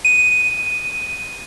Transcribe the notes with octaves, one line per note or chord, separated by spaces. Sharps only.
D#7